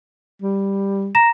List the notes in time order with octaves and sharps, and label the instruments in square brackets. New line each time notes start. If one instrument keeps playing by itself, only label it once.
[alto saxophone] G3
[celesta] A#5 A#6 E7